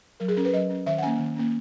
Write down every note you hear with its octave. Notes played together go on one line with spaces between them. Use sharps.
F#3 A#4
G#4
C#4 A#4
B4
F#3 D#5
C#4
D#3 E5
F#5
A#3 C#4 G#5
D#3
A#3 C#4